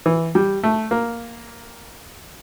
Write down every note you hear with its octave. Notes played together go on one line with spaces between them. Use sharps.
E3
G3
A3
A#3